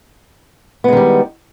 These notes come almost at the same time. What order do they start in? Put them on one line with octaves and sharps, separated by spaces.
B3 G#3 D#3 G3